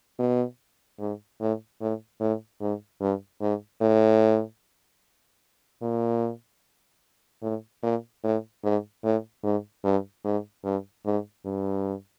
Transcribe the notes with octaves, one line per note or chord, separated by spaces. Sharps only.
B2
G#2
A2
A2
A2
G#2
G2
G#2
A2
A#2
A2
A#2
A2
G#2
A2
G#2
G2
G#2
G2
G#2
G2